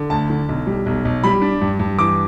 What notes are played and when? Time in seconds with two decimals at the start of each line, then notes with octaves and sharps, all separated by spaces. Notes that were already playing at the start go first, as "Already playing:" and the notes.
Already playing: D3
0.10 D2 A5
0.30 D3
0.49 B1
0.67 G3
0.86 B1
1.05 B1
1.24 G3 B5
1.42 D4
1.61 G2
1.79 G2
1.99 E3 D6